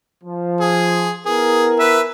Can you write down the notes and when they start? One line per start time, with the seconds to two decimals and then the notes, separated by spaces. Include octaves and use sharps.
0.23 F3
0.60 G#4
1.26 B3 E4 G#4 A#4
1.79 B4 E5